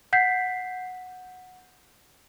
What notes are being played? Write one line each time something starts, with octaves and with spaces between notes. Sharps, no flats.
F#5 G6 B6 C7